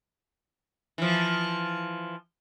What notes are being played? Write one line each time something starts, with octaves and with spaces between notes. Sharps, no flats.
E3 F3